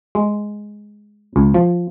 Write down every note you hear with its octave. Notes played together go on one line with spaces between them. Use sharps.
G#3
C#2
F3